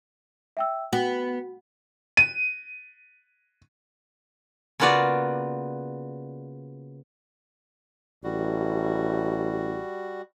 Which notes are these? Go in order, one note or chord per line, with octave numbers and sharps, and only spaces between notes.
E5 G5 E6
B3 F#4
D#7
C#3 A#3 B3 F4 F#4 D5
A1 G3 F#4